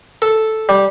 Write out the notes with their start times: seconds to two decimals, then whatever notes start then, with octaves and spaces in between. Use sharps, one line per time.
0.22 A4
0.69 G3